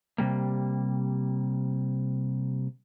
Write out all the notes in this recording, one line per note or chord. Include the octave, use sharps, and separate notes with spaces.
C3 G3 A#3